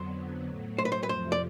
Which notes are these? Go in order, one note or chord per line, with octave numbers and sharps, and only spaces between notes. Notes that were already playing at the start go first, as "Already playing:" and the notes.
Already playing: F2 D3 F#3 B3 C5
A2 F#3 A3
C5
B4
C5
B4
F2 C3 F3 A3 C5
D5